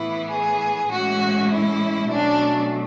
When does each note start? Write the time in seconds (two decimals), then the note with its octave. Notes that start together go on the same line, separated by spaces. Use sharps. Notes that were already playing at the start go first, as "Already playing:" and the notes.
Already playing: A2 E3 B3 E4
0.31 G#4
0.90 A2 E3 G#3 C#4 F#4
1.50 E4
2.08 B2 F#3 A3 C#4 D4